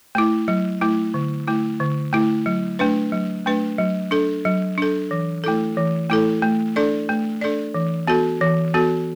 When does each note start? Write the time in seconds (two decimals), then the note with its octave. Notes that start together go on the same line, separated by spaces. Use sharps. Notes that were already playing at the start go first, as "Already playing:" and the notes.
0.15 A3 E4
0.48 F#3
0.81 A3 E4
1.14 D3
1.48 A3 E4
1.80 D3
2.13 A3 E4
2.46 F#3
2.79 A3 D4 B4
3.12 F#3
3.46 A3 D4 B4
3.78 F#3
4.11 D4 A4
4.45 F#3
4.78 D4 A4
5.11 E3
5.44 A3 E4 A4
5.77 E3
6.10 A3 E4 A4
6.42 A3
6.76 D4 A4 D5
7.09 A3
7.41 D4 A4 D5
7.74 E3
8.07 B3 F#4 A4
8.41 E3
8.74 B3 F#4 A4